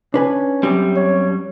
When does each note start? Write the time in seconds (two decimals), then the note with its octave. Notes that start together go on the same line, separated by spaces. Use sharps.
0.14 C#4 D4 B4 G#5
0.63 F#2 G3 C4 G4
0.96 C#5